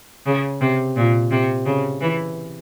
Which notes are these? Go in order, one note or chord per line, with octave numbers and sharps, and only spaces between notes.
C#3
C3
A#2
C3
C#3
E3